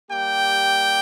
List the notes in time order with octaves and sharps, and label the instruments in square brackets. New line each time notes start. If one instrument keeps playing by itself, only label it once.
[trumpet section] G3 A#3 G4 G5